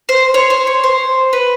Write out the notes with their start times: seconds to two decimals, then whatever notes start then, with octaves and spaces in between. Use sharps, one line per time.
0.09 C5
0.34 C#5
0.50 C5
0.67 C#5
0.84 C5
1.33 B4